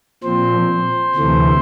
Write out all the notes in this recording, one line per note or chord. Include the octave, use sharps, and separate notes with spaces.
A#2 F3 C4 C5
D2 C3 E3 A3